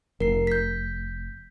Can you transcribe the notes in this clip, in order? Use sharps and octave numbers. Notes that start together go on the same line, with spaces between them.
F1 A#4 C7
G6 B6